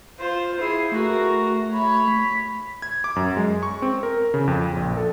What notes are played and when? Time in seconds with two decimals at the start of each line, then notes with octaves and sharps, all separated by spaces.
0.19 F4 C5
0.59 E4 G#4 C7
0.92 A3 F#4 A#4
1.71 C#5 B5
2.08 B6
2.82 G#6
3.04 D6
3.16 F#2
3.37 G#3
3.63 C#6
3.82 C4
4.03 A#4
4.34 C#3
4.47 F2
4.76 A#1
4.97 A4